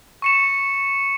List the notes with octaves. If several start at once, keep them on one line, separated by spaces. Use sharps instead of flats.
C#6 C#7 E7